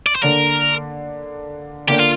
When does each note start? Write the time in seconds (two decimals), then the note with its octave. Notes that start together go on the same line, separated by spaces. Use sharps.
0.07 D5
0.15 C5
0.23 D3 A#3 D4 A#4
1.88 D3 A#3 D4 G4
2.00 F4